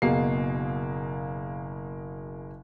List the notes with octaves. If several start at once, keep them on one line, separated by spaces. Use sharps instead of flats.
F#1 B2 A#3 G#4 C7